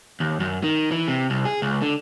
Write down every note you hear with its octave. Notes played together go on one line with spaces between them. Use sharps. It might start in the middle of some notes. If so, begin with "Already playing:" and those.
D#2
F#2
D#3
E3
C3
C2
G#4
C#2
D3